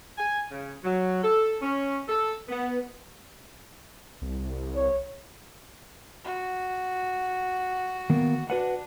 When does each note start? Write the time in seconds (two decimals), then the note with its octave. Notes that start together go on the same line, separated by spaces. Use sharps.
0.18 G#5
0.51 C#3
0.84 F#3
1.23 A4
1.62 C#4
2.08 A4
2.48 B3
4.22 C2
4.76 C#5
6.24 F#4
8.10 D#3 A#3 B3
8.50 D4 F#4 B4 F#5